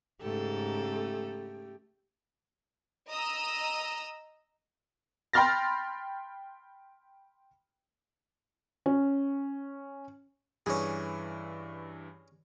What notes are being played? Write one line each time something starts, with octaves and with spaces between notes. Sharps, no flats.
G#2 C#3 A3 G4 A4
D#5 A#5 D#6 E6
G5 B5 C6 F6 A6 A#6
C#4
G2 E3 C#4 G#4